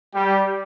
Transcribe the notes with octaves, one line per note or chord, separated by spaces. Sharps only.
G3 G4